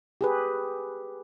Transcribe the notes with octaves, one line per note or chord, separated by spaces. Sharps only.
G4 G#4 B4